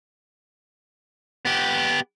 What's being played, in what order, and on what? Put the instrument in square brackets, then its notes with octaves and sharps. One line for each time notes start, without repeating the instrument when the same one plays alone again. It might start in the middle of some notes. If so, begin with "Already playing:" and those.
[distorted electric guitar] B3 G4